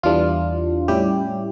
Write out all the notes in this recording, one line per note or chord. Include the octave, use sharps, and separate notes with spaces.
E2 E3 G3 D4 F4
A2 G3 C#4 E4 G4